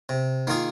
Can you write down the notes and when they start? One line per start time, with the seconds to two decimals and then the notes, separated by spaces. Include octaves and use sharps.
0.09 C3
0.47 D#3 A#3 F4 G#4